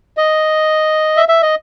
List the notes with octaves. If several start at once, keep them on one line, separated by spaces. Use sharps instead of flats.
D#5
E5
E5
D#5